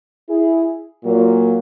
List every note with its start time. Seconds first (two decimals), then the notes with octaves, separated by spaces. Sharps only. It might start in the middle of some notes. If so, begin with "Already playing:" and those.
0.29 E4 G#4
1.04 A#2 F#3 A#3